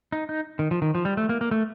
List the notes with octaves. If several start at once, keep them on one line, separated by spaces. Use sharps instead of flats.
D#4
D#4
D#3
F3
D#3
F3
G3
A3
A#3
A#3
A3